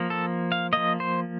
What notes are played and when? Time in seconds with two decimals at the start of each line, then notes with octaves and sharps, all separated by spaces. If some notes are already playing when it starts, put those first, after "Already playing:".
Already playing: F3 A#3
0.10 A4
0.52 F5
0.73 F3 A#3 D#5
1.00 C5